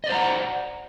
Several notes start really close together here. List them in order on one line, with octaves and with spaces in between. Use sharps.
D#5 D5 C5 A#5 F#5